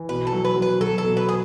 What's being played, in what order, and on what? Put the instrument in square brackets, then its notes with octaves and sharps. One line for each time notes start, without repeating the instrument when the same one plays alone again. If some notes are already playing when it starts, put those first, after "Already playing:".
Already playing: [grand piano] E3
[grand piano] B2 [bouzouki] B4
[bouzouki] A4
[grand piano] F#3
[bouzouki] B4
[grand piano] F#3
[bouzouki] B4
[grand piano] F#3 [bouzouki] A4
[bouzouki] A4
[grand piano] B2
[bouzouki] B4
[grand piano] B3 [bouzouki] G#4